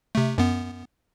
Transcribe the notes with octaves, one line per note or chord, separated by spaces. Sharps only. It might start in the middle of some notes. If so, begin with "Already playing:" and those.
C3 A3
F#2 B3